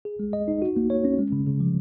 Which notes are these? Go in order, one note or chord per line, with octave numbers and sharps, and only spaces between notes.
G#4
G#3
D#5
D#4
F#4
A#3
C#5
C#4
G#3
C#3
C#3
F3